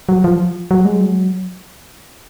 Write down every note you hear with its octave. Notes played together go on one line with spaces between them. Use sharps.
F#3
F3
F#3
G#3
F#3